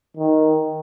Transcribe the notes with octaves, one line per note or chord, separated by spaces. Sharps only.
D#3